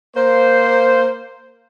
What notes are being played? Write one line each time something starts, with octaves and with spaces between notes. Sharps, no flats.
A#3 C5